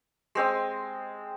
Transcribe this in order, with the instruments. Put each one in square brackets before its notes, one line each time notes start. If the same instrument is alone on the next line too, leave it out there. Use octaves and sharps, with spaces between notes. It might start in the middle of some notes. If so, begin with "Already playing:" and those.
[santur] G#3 C4 D#5